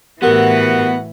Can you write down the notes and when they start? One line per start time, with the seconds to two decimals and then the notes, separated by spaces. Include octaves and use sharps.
0.22 A2 E3 B3 F#4 G4 A#4 B4 F#5